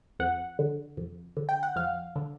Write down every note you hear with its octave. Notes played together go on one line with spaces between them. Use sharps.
F2 F#5
D3
F2
D3
G5
F#5
F2 F5
D3